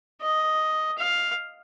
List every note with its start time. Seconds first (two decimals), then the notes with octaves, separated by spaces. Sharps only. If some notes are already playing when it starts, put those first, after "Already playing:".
0.22 D#5
0.98 F5